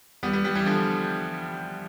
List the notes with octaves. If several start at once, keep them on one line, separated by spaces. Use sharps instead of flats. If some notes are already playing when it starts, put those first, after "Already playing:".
G3 B3
G3 B3
G3 B3
E3 G3
D3 F3